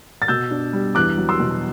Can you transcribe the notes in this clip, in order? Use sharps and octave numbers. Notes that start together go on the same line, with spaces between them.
A6
B2 E6 G6
D4
G3
E2 D6 F#6
F#3
C6 E6
B2